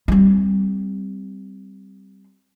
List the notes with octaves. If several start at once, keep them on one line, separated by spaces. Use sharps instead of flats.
G3 C4